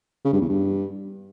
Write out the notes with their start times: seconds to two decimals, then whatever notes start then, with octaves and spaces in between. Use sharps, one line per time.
0.25 C#3
0.33 G2
0.41 E2
0.49 G2